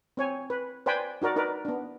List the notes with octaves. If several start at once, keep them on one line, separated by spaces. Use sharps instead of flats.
C4 C#5 G#5
B4
B4 C5 D5 G5 G#5 B5
D#4 F#4 A#4 D5
D#4 A#4 B4 D5
B3 D4